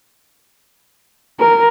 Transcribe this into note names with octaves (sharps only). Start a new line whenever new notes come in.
A#4